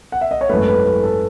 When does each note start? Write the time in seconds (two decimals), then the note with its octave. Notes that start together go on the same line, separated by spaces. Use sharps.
0.12 F#5
0.21 E5
0.31 D#5
0.41 C#5
0.49 G#1 F#2 E3 A3 B4
0.68 B4
0.85 B4
1.03 A4